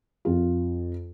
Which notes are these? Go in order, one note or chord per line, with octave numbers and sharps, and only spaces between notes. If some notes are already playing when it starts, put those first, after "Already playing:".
F2 F4